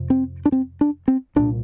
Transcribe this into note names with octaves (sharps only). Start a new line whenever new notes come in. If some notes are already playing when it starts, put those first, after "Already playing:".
Already playing: F2 C3
C4
D4
C4
D4
C4
C2 A#2 D4